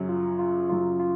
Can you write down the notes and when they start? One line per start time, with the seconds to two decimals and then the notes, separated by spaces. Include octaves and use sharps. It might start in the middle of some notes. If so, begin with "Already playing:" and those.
Already playing: F#2 C#3 F#3 C#4
0.09 F4
0.39 F4
0.69 F#2 C#3 F#3 F4
1.00 F4